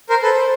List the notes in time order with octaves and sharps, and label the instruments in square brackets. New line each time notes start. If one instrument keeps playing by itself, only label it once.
[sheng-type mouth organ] A#4 C5
[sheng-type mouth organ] A4 B4 [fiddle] C5